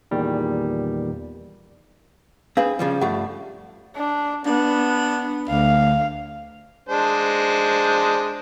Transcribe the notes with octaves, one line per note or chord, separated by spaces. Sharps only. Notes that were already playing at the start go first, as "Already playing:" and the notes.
E2 A#2 D#3 G3
C4 D4 G#4 B4 F5
C#3 F3 G3
G2 F3 A3 G4 F#5
D4
B3 D4
D2 F5
G#3 D4 C5